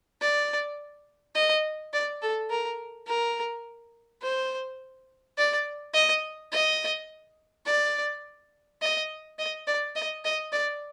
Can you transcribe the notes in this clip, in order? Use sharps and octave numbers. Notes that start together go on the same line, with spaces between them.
D5
D#5
D5
A4
A#4
A#4
C5
D5
D#5
D#5
D5
D#5
D#5
D5
D#5
D#5
D5